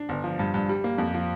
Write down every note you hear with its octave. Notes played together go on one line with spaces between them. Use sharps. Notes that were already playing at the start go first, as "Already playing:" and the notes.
Already playing: D4
G1
F3
G2
G2
G3
A#3
F2
F3